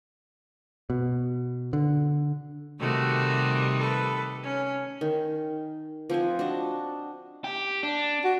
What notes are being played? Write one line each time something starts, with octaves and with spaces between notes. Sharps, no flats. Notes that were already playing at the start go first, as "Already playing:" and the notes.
B2
D3
C3 D#3 G3 A3 F#4
A4 B4
C#4
D#3
F3 C4 F#5 G#5
D4 F#4 D#5
G4
D4
F#4